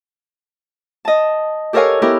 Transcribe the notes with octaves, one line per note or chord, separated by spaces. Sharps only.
D#5 A5
G4 A4 A#4 C#5 F5 G#5
B3 E4 G4 A#4